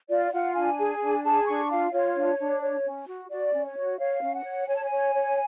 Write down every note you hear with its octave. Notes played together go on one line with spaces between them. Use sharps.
F4 D5
F4 F#5
D4 G#5
G#4
D4
G#4 A5
D4 C#6
F4 F5
F4 C#5
D4
D4
C#5
C#4
F#4
F#4 D5
C#4
C#5
F#4
C#5 F5
C#4
F#5
C#5
C#5 G#5
A5
G#5
C#5
C#5